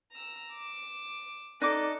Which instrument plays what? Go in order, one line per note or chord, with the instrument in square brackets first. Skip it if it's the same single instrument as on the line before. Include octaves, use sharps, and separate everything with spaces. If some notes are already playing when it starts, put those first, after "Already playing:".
[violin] A#5 E6
D6 E7
[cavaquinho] D#4 D6 [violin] A4 [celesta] D5 F#6